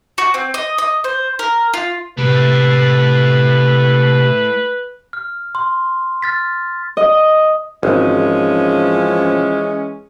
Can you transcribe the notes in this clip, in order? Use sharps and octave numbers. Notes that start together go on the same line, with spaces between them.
F#4
C4
D#5
D#5
C5
A#4
F4
C3 A3 E4 B4
F6
C6
F6 A6 B6
D#5
G#1 E3 F3 G#3 C#4